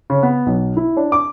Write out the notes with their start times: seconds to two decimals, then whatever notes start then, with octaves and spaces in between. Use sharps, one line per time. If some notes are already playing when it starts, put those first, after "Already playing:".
0.10 C#3
0.23 B3
0.46 B1
0.77 E4
0.97 D4
1.12 D6